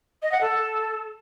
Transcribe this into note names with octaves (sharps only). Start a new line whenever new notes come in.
D#5
F#5
A4